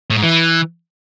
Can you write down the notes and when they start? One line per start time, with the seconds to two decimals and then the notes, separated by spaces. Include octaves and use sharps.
0.10 A2
0.17 G#2
0.23 E3